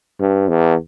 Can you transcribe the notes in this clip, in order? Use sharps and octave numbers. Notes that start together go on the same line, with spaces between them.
G2
E2